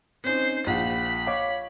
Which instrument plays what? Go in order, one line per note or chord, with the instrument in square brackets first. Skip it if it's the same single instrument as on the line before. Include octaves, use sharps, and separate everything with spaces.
[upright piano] C4 C#4 D#4 [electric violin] C5
[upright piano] A#1 F4 F#5 [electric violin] B5
[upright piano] C#5 F5 D6